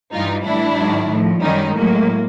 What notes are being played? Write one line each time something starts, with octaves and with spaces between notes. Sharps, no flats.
G2 E3 G3 D#4 F4
A2 E3 G3 D4 E4
G#2 D#3 F#3
A2 F3
F#2 D#3 G3 C#4 D#4
A2 F#3 G#3 A#3